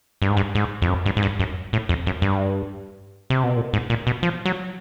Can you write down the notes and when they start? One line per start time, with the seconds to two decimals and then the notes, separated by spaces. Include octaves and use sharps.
0.22 G2
0.30 G#2
0.37 G2
0.55 G#2
0.82 F2
0.89 F#2
1.06 G2
1.17 G#2
1.23 G2
1.40 F#2
1.73 A2
1.89 F2
2.07 F#2
2.22 G2
3.30 C3
3.43 B2
3.56 A#2
3.73 G#2
3.90 A#2
4.07 B2
4.23 F3
4.45 F#3